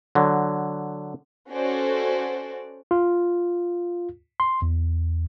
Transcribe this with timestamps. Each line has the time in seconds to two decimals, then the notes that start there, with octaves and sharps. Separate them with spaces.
0.15 D3 F#3
1.50 C#4 F#4 A4 C5 D5
2.91 F4
4.40 C6
4.62 E2